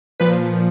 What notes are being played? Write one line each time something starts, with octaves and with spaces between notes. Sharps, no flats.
A#2 F3 B4